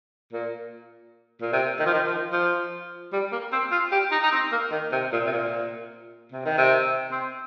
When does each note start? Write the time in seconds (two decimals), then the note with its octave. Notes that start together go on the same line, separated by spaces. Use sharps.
0.33 A#2
1.42 A#2
1.53 C3
1.79 D#3
1.86 F3
1.94 D#3
2.06 F3
2.32 F3
3.13 G3
3.32 A#3
3.53 C4
3.71 F4
3.92 G4
4.12 D#4
4.23 D#4
4.32 C4
4.52 A#3
4.72 D#3
4.92 C3
5.12 A#2
5.26 C3
5.32 A#2
6.32 C3
6.45 D#3
6.58 C3
7.11 C4